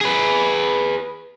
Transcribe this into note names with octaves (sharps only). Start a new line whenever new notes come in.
G#4 B4